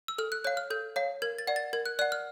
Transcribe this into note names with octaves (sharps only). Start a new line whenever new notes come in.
E6
A4 F6
F#6
C#5 F5 F#6
F6
A4 G6
C#5 F5
A#4 G#6
A6
D5 F#5
A6
A#4 G#6
F#6
D5 F#5 F#6
F6